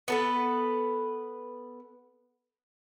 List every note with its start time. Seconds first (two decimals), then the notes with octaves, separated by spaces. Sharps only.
0.08 B3 A4 B4